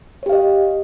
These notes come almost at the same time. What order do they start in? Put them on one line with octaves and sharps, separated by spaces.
C#5 G4 F5 D#5